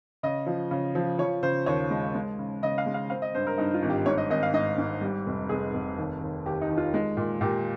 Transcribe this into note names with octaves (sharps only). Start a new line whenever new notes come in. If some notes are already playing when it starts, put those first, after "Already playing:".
C#3 D#5
F3
C#3
F3
F3 C#5
C#3 C5
D#2 C#5
G#3
G#3
C#3
C#3 D#5
F5
G#3
F5
C4 F5
D#5
G2 C5
A#4
G2 D#4
F4
G#1
G4
G#2 C#5
D#5
G#1 D#5
F5
G#2 D#5
G#2
G3
F1
F1 G#4
F1
D#2
D#2
D#2 G4
D#4
D#3
F4
G#3
A#2
A#2 G4